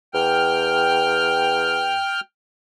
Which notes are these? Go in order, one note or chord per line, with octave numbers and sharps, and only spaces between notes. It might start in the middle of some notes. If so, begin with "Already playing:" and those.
E2 G5 F6